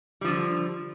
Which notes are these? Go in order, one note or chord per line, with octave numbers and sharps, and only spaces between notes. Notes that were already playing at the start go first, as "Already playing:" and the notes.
D3 F3 G3